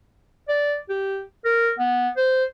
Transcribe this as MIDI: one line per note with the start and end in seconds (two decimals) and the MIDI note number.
0.48 0.77 74
0.89 1.23 67
1.45 1.71 70
1.79 2.09 59
2.17 2.44 72